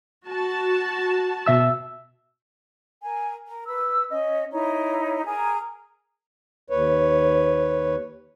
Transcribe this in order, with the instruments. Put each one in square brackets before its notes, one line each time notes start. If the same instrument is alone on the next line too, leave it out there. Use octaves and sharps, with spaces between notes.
[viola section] F#4 A5
[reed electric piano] B2 E5 E6
[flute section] A#4 G#5
A#4
B4 E6
C#4 D#5
D#4 E4 C#5 A#5
G#4 A#4 G#5 A#5
[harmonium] D#2 B4 C#5